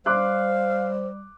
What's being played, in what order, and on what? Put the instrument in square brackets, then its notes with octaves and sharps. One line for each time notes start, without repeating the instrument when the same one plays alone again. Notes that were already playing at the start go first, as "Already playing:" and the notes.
[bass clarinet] G3 [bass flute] C5 [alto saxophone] F5 [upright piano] C6 D6 F#6